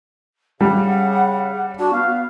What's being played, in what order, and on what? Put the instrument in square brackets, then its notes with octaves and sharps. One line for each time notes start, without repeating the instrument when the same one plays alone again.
[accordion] C#3 [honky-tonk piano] G3 [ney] F#5
[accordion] D4 [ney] F#4
[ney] B3 [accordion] F5